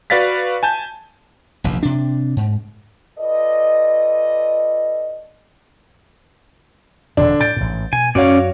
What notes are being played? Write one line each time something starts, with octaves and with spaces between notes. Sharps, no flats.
F#4 B4 D5 F5 A6 B6
G#5 A5 G6
F1 A#1 D#2
C3 D4
G#2
F4 A4 B4 D5 D#5
E1 A#2 D3 D4
A2 G6 A6 D7
A1 G#2
B2 G#5
F#2 C#4 F#4 C#5 D5 F5